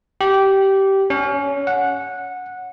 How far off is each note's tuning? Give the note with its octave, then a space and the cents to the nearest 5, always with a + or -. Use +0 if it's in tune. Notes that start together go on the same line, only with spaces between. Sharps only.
G4 -15
C#4 +20
F#5 -15